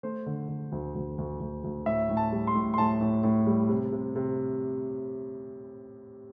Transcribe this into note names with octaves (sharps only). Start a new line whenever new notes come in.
A3 C5
D3
D3
D2
D2
D2
D2
D2
A2 E5
A2
A5
G3
C6
A2
C6
A2 A5
A2
A2
G3
C3
C3
C3